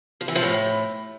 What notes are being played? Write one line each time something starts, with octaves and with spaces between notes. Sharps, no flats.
F3
E3
F3
A2